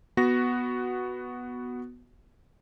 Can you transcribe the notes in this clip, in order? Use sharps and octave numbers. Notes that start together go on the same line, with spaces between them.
B3 F#4 A#6